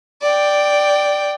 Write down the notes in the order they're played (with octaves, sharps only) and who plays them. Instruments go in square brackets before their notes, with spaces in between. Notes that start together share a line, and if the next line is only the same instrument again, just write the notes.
[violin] D5 G5